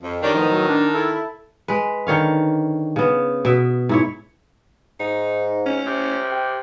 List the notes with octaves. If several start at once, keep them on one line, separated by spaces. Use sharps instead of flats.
F2
D#3 G3 C#4 D4
A2 F3 B3 D#4
F#3
D4
E4 A4
G#3 B4
D3 D#3 C#5 F5
C#3 B3
B2 E5
G#2 E4 C#5
G#2 D#4
C#4
C3
G4